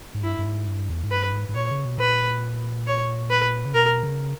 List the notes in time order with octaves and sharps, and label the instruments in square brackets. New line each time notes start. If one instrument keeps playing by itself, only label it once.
[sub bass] G#2
[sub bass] G2 [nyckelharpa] E4
[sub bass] G2
G#2
G2
E2
G#2
[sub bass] G2 [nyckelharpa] B4
[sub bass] G#2
G#2
[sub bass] A#2 [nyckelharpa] C#5
[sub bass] C#3
B2
[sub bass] A#2 [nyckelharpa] B4
[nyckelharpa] C#5
B4
[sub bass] C#3
[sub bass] B2 [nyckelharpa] A#4
[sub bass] C#3